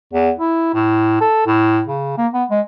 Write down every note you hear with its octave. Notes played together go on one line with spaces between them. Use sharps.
E2
E4
A2
A4
A2
C#3
A#3
B3
G#3